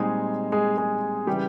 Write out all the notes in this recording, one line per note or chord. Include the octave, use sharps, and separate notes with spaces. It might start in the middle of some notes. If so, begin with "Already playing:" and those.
Already playing: A#2 G3 G#3 C4 D#4 G#4
G#3 G#4
G#3 G#4
C#3 E3 G3 G4